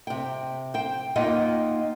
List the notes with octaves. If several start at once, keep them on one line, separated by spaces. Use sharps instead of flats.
C3 G5
C5 G5
A#3 D#4 F4 D#5 F#5 G5